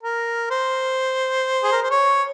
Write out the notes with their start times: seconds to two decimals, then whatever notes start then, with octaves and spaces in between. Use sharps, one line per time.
0.03 A#4
0.51 C5
1.64 G#4
1.72 A#4
1.83 C5
1.91 C#5